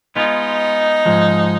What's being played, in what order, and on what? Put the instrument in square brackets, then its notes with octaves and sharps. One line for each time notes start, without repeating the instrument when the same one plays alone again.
[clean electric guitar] G#3 B3 F4 [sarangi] D#4
[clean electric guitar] G#2 F3 G#3